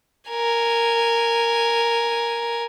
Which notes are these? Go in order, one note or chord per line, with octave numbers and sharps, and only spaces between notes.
A#4 G#5